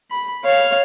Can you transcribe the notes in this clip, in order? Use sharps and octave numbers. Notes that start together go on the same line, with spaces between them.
B5
C#5 F5